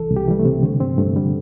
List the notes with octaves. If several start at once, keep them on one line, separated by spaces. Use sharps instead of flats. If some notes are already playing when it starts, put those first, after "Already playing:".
Already playing: C2 E3 A4
C2
G4
E3 G3
A3
C3
D3
G2 C4
G2 A3
D3 G3